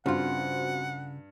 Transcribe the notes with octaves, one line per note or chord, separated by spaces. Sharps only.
G2 C#3 C4 F4 F#4 C5 F#5